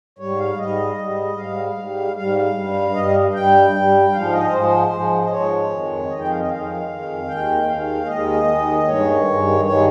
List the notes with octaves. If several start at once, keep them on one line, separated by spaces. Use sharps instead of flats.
G#2 G3 C#5
F5
G#2 G3 D#5
G#2 G3
G#2 G3 F5
G#2 G3
G#2 G3 F5
G2 G3
G2 G3 D#5
G2 G3 G5
G2 G3
G#2 F3 G#3 F5
D#5
G#2 F3 G#3 C5
G#2 F3 G#3
D#5
G#2 F3 G#3 C#5
F2 D#3 G#3
F2 D#3 G#3 D#5
G5
F5
D#5
F2 D#3 G#3 F5
F2 D#3 G#3
D#2 D#3 G#3 G5
D#2 D#3 G#3 F5
D#2 D#3 G#3 D#5
D#2 D#3 G#3
G2 D#3 G#3 C#5
G2 D#3 G#3
G2 D#3 G#3 C#5